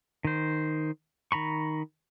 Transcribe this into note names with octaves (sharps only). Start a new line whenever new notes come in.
D#3 C5
D#3 A#5 B5 C#6